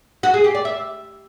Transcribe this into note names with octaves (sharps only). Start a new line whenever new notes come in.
F#4
G#4
G4
D5
E5